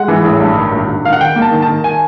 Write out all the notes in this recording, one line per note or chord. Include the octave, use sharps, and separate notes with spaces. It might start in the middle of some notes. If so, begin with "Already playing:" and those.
Already playing: G#3 F#5
E3
A1
G2
D#3
A#1
A#1
D#3 F5
F#5
D#3 G5
A#3
A5
D#3
A5
D#3
G#5